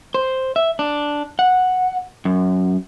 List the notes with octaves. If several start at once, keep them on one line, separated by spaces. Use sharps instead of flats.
C5
E5
D4
F#5
F#2